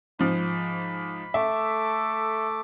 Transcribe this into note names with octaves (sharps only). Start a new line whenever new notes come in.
G#2 F3 B5
A3 A4 E5 D6